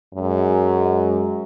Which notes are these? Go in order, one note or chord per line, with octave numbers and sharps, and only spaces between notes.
F#2 G#3